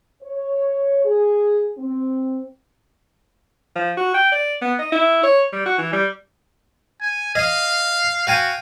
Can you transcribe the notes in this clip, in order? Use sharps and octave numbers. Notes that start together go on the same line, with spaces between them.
C#5
G#4
C4
F3
F#4
G5
D5
B3
D#5
E4
C#5
G3
F#4
E3
G3
G#5
D#5 F5
F#4 F5 G5 G#5